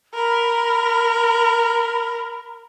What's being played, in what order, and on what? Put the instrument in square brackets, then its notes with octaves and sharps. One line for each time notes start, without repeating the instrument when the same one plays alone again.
[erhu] A#4 [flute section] B5